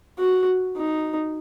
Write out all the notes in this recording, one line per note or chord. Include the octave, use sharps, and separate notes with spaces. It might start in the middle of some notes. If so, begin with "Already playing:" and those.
F#4
D#4